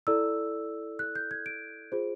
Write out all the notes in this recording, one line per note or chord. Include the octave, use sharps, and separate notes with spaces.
E4 A4 D5 E6
F#6
G6
G#6
D7
F4 G#4 C5